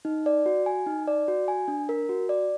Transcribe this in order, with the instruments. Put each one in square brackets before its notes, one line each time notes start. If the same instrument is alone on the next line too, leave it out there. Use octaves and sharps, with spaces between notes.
[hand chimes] D#4
D5
F#4
G#5
D#4
D5
F#4
G#5
D4
A#4
F#4
D5